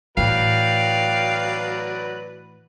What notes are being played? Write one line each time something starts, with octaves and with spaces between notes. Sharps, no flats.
A2 E3 F#3 B4 D5 F5 G5